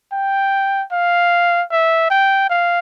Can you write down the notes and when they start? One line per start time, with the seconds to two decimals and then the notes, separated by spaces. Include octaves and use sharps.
0.12 G5
0.92 F5
1.72 E5
2.10 G5
2.50 F5